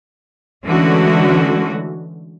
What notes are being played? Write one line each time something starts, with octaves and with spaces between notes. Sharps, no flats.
D3 E3 G#3 A3 C#4 F#4